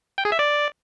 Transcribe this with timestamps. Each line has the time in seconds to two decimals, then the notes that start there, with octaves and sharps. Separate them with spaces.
0.18 G5
0.25 G#4
0.32 E5
0.39 D5